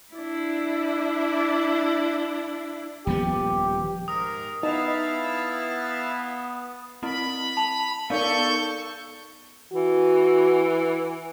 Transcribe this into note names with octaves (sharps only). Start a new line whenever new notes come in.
D4 E4
D#1 F3 B3 G4
G#2 A#4 D#6
B3 D#4 E4 F5 A5
C4 E4 D#5 B5
A5 F7
B3 D#4 A4 A#4 D5 F5 C#6 G6
E3 F#4